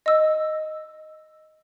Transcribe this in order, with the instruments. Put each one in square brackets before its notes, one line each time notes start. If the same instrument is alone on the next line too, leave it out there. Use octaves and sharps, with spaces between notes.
[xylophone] D#5 E6